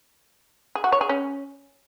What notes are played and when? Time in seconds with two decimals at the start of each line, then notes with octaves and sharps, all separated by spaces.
0.75 G#4
0.84 F#4
0.92 C#5
1.01 G#4
1.09 C#4